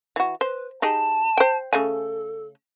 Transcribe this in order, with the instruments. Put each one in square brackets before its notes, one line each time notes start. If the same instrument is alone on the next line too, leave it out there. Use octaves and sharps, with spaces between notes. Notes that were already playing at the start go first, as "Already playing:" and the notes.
[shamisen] E3 F#4
[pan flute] B4 [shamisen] C5
[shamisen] D#4 G4 G#4 [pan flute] A5
[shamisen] C5 G5
[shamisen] C#3 A3 G#5 [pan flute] A4